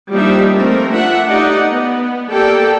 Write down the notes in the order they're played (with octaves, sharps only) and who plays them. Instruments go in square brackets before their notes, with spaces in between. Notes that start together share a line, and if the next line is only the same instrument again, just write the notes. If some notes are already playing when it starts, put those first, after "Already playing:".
[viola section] F3 G3 A#3 D4 D#4 E5
A3 A#3 C4 A#4
D4 F4 E5 F#5
A3 D#4 G4 D5 D#5 F#5
B3
A#3 G4 A4 D5 G5